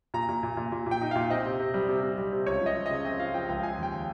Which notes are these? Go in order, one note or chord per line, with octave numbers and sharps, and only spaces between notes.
A#2 A#5
A#2
A#2
A#2
A#2
A#2 G5
D#4
A#2 F5
C4 D#5
C3
C3
G3
C3
C3
G3
C3
C#2 C#5
F3 D#5
F3
C#3 D#5
C4 D#5
F3 F5
F3 G5
C#2 G5
F3 G#5
D#2 G5